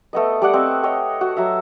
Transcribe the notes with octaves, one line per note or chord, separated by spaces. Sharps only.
A3 B3 D#5
G3 D5 F#5
C4 D#5
C#5 D#5 G5
F#4
F#3 E5